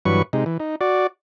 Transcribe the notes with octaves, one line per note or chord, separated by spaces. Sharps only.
G2 E3 F#3 B4 C#6
C3 G#3 D#4
E3
D#4
F#4 D5